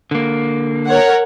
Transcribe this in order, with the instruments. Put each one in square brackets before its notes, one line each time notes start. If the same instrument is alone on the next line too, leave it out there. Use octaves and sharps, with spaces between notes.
[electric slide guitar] D3 A#3
[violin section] A#4 C#5 F#5